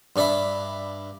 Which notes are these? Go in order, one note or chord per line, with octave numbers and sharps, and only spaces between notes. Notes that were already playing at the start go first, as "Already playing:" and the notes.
G2 D4 D5 E5 B5